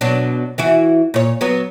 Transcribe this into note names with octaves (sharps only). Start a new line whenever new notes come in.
B2 F#3 D4
E3 E4 F#4
A#2 C#5
F#3 B3